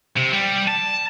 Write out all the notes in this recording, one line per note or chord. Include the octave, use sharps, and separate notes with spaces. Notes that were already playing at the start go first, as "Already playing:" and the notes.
C3
G3
A5